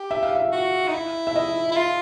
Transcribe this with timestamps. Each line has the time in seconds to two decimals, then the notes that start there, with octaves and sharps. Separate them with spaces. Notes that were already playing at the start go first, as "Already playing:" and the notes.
Already playing: G4
0.11 E5
0.23 F5
0.35 E5
0.52 F#4
0.88 D#4
0.93 E4
1.27 E5
1.36 D#5
1.72 E4
1.76 F4